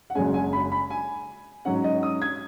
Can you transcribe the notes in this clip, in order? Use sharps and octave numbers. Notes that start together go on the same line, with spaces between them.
F#5
F#1 F#2 C#3 G#3 C#4 G#5
G#5
B5
B5
G#5
G#2 F#3 C#4 F#5
D#5
D#6
G#6